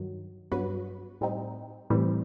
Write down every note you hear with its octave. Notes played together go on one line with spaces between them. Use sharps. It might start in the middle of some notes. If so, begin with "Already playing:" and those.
Already playing: G2 D#3 F#3
G2 F#3 B3 F#4 B4
A2 G3 C4 D#4
A2 E3 G3 C4